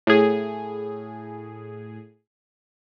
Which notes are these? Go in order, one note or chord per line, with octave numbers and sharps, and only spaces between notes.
A2 G#4